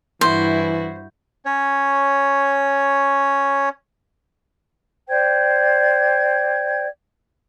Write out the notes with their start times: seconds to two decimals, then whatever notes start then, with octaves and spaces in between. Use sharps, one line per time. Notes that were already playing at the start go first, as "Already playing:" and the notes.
0.21 G2 E3 E4 F#4 C5
1.45 C#4 C#5
5.09 C5 D5 G5 G#6